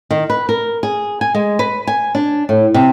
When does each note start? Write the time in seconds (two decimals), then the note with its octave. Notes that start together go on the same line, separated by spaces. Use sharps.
0.11 D#3
0.30 B4
0.49 A#4
0.83 G#4
1.21 G#5
1.35 G#3
1.59 B4
1.87 G#5
2.15 D4
2.49 A2
2.74 C3